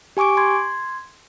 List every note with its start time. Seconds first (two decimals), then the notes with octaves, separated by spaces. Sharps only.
0.17 G4 G#5 C#6 D6 D7
0.37 C6 G#6